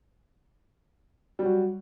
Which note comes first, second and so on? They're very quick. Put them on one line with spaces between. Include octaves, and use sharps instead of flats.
G3 F#3 F#4